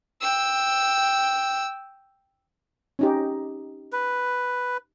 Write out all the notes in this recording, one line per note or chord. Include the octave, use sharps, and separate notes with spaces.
G5 E6
C#4 D#4 G4
B4